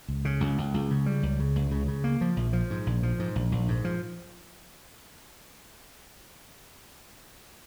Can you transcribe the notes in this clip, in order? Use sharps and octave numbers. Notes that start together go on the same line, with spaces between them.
C#2
C#3
C#2
C#2
C#2
C#3
G3
C#2
C#3
C#2
C#3
C#3
A#3
F3
A#1
F3
G#2
A#1
F3
G#2
A#1
A#1
G#2
F3